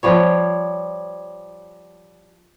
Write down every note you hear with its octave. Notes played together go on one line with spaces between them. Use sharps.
F3 G3 C#5